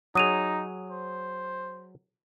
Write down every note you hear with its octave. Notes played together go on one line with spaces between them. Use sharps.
F#3 D#4 G#4 D#6 D#7 F7
C5